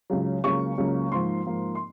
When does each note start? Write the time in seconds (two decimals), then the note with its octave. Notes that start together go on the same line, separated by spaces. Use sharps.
0.10 C#2 C#3 F#3
0.44 C#2 C#3 F#3 A#3 C#4 C#6
0.78 C#2 C#3 F#3 A#3 C#4
1.12 G#2 F3 A#3 C6
1.47 G#2 F3 A#3
1.75 C6